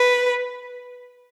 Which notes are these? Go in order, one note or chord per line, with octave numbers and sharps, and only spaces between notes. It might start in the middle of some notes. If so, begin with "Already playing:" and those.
Already playing: B4